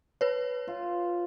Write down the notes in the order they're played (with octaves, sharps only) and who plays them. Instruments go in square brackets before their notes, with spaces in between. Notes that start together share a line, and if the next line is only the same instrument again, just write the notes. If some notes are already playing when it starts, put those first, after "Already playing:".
[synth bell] B4 C#5
[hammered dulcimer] F4